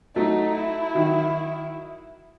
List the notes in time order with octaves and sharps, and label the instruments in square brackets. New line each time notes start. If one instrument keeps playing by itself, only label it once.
[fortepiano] F#3 A3 [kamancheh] D#4
[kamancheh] E4
[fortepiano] D#3 F#3